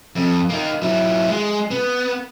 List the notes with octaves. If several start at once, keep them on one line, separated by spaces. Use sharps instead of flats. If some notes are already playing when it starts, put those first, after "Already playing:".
F2
A#3 D#4
F#3 E4
G#3
B3